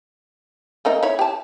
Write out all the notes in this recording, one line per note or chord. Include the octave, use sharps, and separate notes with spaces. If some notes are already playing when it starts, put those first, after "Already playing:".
A3 A#3 D#4
E4 C#5
G4 A5